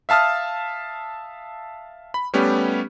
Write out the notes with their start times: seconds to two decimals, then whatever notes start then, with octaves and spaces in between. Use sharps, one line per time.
0.09 E5 F5 A5 D#6 F6
2.14 B5
2.34 G3 A3 B3 C#4 G4